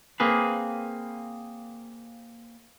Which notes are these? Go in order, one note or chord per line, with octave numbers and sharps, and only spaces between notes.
A#3 C4 G#4 B4